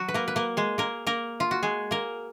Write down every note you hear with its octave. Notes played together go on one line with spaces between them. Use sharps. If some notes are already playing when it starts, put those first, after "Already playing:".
Already playing: F#3 F#4
B4
A#3 A#4
B4
A#3 A#4
G#3 G#4
A#3 A#4
A#3 A#4
F4
F#4
G#3 G#4
A#3 A#4